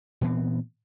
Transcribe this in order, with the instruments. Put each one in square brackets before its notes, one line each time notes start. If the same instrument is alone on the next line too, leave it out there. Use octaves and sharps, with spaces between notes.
[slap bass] A#2 E3 B3 C4